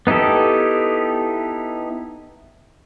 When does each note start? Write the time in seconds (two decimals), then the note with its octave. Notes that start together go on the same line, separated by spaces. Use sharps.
0.07 B3 D#4 E4 G4 A4